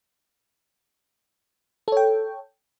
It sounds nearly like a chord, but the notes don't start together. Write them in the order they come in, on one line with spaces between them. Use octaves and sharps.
A4 C#5 G5